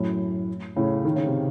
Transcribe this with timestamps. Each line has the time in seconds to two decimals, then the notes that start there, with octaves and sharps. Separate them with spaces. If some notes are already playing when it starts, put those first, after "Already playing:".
Already playing: F#2 A2
0.76 A2 C#3
1.05 D#3
1.16 C#3
1.26 C3